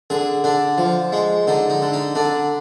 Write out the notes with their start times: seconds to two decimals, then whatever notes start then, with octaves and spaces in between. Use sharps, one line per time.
0.10 D3 G#4
0.44 D3 D4
0.78 F3
1.12 G#3
1.47 D3 D#4
1.70 D#4
1.82 D3
1.93 D#4
2.15 D3 D4